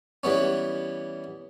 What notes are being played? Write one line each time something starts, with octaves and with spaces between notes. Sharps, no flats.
E3 G3 B3 C#4